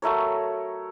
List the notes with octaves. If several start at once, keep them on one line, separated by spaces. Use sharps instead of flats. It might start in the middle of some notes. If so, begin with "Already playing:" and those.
F#3 A3 A#4 C#5